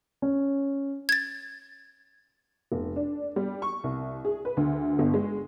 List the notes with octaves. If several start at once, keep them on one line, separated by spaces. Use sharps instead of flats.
C#4
G#6 A6
F1
D4
G3
C#6
C2
G#4
B4
D2
G1
G#3